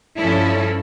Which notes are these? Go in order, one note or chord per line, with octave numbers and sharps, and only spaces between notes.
G2 F3 C#4 E4 A4